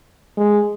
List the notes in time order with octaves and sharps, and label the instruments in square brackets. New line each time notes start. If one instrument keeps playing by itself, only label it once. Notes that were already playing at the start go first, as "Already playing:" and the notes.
[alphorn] G#3